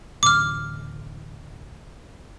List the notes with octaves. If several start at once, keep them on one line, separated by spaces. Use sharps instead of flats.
A1 D2 D6 F6